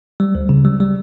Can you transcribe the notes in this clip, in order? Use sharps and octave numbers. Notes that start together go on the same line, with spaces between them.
G3
D2
C#3
G3
G3